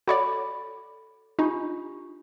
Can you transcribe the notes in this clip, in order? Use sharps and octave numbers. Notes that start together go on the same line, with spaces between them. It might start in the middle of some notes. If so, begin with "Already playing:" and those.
F#4 A4 C#5 D5 B5
D4 D#4 F4 G4